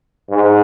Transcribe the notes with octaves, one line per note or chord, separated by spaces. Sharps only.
G#2